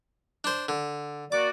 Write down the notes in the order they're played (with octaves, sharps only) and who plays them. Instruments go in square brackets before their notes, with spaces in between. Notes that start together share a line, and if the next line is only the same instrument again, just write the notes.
[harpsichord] D4 C5
D3
[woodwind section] A#3 F#4 D5 [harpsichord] D6